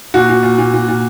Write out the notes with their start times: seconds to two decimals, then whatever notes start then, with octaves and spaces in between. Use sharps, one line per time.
0.14 A#2 F#4
0.29 A#2
0.43 A#2
0.58 A#2
0.74 A#2
0.88 A#2